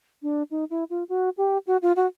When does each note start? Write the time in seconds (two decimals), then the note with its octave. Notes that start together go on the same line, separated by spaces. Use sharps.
0.22 D4
0.51 D#4
0.70 E4
0.90 F4
1.09 F#4
1.37 G4
1.67 F#4
1.82 F4
1.96 F#4